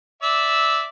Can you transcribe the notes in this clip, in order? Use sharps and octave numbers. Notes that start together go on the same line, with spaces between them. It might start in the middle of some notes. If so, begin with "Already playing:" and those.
D5 E5 E6